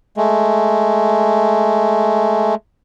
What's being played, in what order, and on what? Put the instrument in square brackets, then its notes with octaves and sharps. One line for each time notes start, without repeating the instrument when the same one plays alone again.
[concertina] G#3 A3